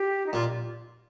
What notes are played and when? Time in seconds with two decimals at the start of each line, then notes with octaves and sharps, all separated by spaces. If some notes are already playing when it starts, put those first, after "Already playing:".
Already playing: G4
0.26 D#4
0.33 A#2 F4